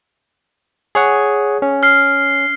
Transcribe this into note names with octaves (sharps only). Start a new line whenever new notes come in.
G#4 C#5 F#5
C#4
F6 C7